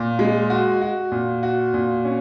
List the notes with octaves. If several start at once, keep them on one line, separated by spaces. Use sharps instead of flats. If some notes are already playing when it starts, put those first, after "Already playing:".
Already playing: A#2
G#3
F#4
F#4
A#2
F#4
A#2
C#4